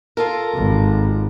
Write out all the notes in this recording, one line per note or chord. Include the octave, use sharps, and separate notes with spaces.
F4 A4 A#4
G#1